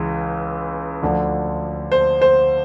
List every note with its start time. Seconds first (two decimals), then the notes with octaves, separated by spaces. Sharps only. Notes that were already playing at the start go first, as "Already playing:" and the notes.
Already playing: C#2 C#3 E3
1.02 D2 D3 F3
1.92 C5
2.22 C5